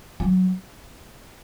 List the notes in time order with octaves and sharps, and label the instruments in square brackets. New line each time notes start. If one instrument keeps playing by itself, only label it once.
[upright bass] F#3